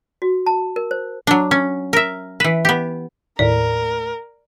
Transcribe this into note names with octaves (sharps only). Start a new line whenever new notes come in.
F#4
A5
A#4
C5
F#3 D4
C#4
A#4 E5
E3 B4
B3 G4
D#2 A2 A#4 D5